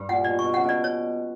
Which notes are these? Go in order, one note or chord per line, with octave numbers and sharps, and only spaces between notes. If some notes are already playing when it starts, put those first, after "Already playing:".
Already playing: G2
A#2 F#5
B2 D5
C#6
B2
C#3 F#5
B2
D5
C#5